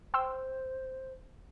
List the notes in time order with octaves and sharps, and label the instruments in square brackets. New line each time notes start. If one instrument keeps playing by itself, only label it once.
[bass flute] C5 [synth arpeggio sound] G5 C6 E6